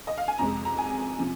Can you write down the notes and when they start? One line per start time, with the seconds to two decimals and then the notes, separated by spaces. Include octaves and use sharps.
0.07 D#5
0.18 F5
0.28 G#5
0.38 F2 C3 G#3 A#5
0.65 A#5
0.78 G#5
1.19 C3 F3